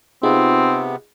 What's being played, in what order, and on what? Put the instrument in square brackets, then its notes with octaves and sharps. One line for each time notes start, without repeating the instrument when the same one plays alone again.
[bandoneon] C3 B3 [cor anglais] C4 [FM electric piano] D#4 F4 G#4